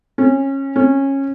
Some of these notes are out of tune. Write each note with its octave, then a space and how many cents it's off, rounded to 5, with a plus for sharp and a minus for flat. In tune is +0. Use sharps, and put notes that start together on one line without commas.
C#4 -25
C#4 -20